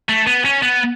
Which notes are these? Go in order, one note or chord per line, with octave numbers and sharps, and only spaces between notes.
A3
B3
C#4
B3